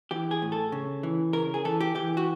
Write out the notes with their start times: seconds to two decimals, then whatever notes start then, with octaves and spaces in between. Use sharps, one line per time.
0.11 E3 G4
0.31 G#4
0.42 A2
0.52 A4
0.72 C#3
1.03 E3
1.33 C#3 A#4
1.54 G#4
1.65 E3 A4
1.81 G4
1.95 E3 G4
2.17 F#4